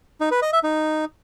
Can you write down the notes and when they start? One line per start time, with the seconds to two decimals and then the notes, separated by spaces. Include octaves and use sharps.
0.21 D#4
0.31 B4
0.42 D#5
0.53 E5
0.64 D#4